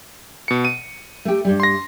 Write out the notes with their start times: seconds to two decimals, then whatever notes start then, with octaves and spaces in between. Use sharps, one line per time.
0.48 B2 C#7
0.65 D#7
1.25 A3 G4
1.45 G2 G3
1.60 C6 A#6